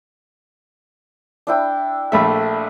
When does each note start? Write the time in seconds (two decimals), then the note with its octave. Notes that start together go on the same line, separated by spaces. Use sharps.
1.47 D4 E4 G5
2.12 A#1 A3 A4 E5 B5